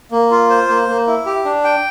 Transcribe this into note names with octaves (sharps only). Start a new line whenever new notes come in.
A#3
F4
C5
A#3
A#3
E4
G4
D4
G5